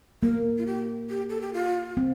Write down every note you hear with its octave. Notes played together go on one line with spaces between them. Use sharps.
A#3 A#4
F4
G4
G4
A4
G4
F4
C4